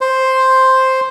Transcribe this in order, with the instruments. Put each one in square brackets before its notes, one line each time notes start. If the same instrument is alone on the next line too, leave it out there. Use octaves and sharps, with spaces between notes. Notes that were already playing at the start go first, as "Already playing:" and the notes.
[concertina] C5